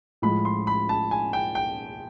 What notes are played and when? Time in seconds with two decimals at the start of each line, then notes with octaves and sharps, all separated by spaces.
0.22 A2 F3 G#3 B5
0.45 C6
0.67 B5
0.89 A5
1.11 G#5
1.33 G5
1.55 G5